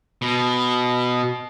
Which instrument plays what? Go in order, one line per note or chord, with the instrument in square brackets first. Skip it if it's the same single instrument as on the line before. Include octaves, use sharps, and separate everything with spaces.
[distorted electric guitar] B2